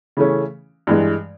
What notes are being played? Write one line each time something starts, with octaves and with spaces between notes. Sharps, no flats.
C#3 E3 A3 C#4
G2 E3 G#3